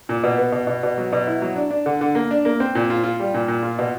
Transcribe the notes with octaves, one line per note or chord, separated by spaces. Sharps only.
A#2
B2
B3
B2
B2
B2
F#3
B2
E4
F#3
D4
D4
D3
D3
A#3
D4
A#3
C4
A#2
F4
F4
G3
A#2
A#2
F4
B2